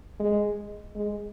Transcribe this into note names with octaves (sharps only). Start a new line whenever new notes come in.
G#3
G#3